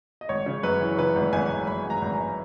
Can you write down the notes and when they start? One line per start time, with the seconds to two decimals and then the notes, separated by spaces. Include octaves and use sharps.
0.21 D#5
0.29 G#1 C#5
0.46 C#3
0.63 F#2 B4
0.81 E3
0.98 C#3 B4
1.15 G#1
1.33 G#1 G#5
1.50 G#1
1.67 F#2 B5
1.85 G#1
1.90 A#5
2.02 G#1
2.14 A#5
2.19 G#1